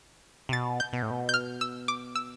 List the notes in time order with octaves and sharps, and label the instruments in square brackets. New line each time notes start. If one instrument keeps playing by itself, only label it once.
[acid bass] C3
[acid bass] B2 [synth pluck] A6
[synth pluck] G6
[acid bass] B2
A2
B2
[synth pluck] G6
F6
E6
D6
E6